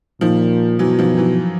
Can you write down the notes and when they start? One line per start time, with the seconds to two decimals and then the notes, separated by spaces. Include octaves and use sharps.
0.21 A#2 D#3 F3
0.79 B2 E3 F#3
0.99 D#3 F3
1.18 E3 F#3